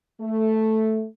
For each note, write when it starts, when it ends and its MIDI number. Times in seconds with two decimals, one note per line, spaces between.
0.21 1.05 57